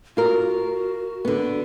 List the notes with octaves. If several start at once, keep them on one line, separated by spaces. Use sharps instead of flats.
F4 F#4 A#4
D3 B3